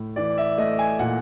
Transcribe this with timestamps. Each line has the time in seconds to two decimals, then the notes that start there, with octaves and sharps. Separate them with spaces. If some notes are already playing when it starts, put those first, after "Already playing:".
Already playing: A2
0.16 E3 D5
0.38 E5
0.58 A3 D#5
0.79 G#5
0.99 A#2 F#5